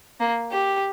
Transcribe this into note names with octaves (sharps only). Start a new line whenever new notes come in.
A#3
G4